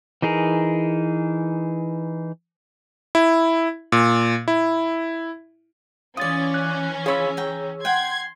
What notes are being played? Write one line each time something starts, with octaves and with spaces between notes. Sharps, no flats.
E3 D#4 G#4 A#4
E4
A#2
E4
E3 C#4 F4 D5 D#6 A6
F#6
F4 G#4 C#5 B5 E6
G5 A#5
F#5 G5 C6 G#6